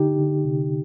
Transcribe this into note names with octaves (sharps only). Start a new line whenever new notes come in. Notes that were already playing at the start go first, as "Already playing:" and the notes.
Already playing: D3 D#4 G4
D3
C3